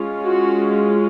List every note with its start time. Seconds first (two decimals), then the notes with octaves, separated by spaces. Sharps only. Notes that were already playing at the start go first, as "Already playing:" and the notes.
Already playing: G#3 C#4 F4
0.23 F#4